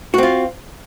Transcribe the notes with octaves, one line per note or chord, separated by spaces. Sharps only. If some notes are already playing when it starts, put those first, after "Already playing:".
C4 F4 F#4